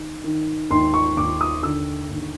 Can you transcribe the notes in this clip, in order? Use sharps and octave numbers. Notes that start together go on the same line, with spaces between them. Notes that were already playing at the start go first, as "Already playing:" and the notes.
Already playing: D#3
D#3
D#2 C6
C#6
D#2 D6
D#6
D3 E6
D#2